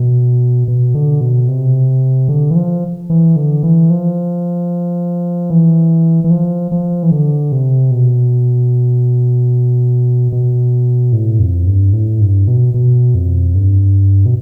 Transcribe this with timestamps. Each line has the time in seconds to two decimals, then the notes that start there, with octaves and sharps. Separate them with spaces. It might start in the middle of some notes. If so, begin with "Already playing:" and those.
Already playing: B2
0.68 B2
0.94 D3
1.21 B2
1.48 C3
2.29 D3
2.50 E3
2.56 F3
3.10 E3
3.36 D3
3.63 E3
3.90 F3
5.50 E3
6.24 E3
6.31 F3
6.71 F3
7.03 E3
7.12 D3
7.52 C3
7.91 B2
10.32 B2
11.13 A2
11.39 F2
11.67 G2
11.93 A2
12.21 G2
12.48 B2
12.74 B2
13.15 F2
13.55 G2
14.26 B2